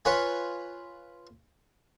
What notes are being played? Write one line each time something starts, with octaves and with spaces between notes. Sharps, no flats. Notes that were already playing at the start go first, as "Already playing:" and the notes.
F4 B4 C#5 G#5